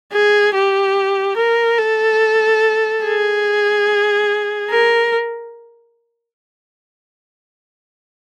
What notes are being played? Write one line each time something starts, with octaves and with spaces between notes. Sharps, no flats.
G#4
G4
A#4
A4
G#4
A#4